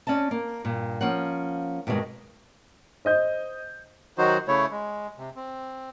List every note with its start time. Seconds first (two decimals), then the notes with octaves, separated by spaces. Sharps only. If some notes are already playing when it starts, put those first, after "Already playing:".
0.07 C#4 D5 D#5 A5
0.31 A#3
0.65 G2 A#2
1.01 F3 A#3 C#4 F#5
1.87 G2 B2 D#3 G#3
3.05 C5 D#5 G6
4.18 D#3 F#3 D#4 F#4 C5
4.48 C#3 A3 E4 C#5
4.71 G#3
5.18 C3
5.36 C4